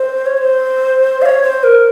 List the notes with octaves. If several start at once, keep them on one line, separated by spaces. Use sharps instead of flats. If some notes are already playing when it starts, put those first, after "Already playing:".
Already playing: C5
C#5
C5
F5
C#5
C5
A#4